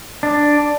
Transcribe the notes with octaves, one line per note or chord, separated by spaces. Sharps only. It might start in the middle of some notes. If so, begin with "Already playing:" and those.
D4